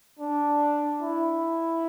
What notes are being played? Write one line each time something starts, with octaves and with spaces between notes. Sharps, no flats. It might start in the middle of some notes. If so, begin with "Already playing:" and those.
D4
E4